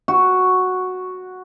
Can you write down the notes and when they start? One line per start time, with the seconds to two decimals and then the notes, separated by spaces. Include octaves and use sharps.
0.08 F#4